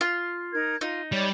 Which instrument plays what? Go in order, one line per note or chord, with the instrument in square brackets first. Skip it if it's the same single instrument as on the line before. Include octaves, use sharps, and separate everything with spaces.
[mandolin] F4
[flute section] D#4 A#4 G#6
[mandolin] D#4 [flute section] F4
[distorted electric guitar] G3 [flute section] G4 C#5 D5